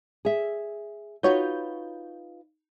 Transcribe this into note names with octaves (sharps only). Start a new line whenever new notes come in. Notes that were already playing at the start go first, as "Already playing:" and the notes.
G#4 E5
D#4 F4 F#4 B4 C#5 G6